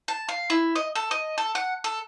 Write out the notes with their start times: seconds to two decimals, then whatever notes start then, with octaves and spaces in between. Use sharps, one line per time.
0.08 A5
0.29 F5
0.50 E4
0.75 D#5
0.95 A4
1.11 D#5
1.38 A4
1.55 F#5
1.84 A4